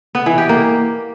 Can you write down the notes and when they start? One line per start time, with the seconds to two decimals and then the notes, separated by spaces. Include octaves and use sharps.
0.15 B3
0.26 E3
0.38 G4
0.49 A#3